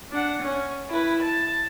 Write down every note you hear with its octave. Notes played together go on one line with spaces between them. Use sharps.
D4 F#5
C#4
E4 B4
A5